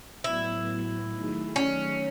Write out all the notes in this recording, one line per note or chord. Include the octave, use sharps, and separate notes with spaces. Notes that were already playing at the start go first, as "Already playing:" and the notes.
A2 F#3 B3 E4
D#3 F#3 A3 D#4 G#4
C#4